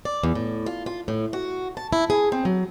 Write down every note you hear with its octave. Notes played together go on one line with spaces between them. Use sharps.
D5
E2
A2
F4
F4
A2
F#4
A5
E4
G#4
C4
F#3